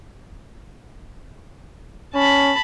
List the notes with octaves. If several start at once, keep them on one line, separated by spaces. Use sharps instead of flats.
C#4 A5 B5